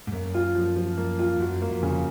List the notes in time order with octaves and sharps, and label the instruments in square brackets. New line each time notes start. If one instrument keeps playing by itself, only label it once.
[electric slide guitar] G#2
[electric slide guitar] F#2 [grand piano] A#3
[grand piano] F4
F3
F3
A#3
F4
[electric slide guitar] F#2 [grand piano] F#3
[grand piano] A#3
[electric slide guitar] F2
[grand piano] C#3